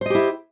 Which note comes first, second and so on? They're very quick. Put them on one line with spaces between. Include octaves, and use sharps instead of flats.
C5 D#5 G4 E4